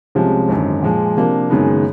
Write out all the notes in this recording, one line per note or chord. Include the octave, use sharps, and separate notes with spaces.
C2 C3 F3 G#3 C#4
G#1 F#2 D3
A#2 F3 G#3
C3 F3 A#3 D4
F#1 F#2 D#3 G#3 B3